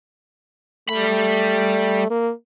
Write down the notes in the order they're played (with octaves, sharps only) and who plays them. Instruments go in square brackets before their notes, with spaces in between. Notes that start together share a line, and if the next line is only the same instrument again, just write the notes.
[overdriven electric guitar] G3 B5 [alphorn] A3
[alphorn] A#3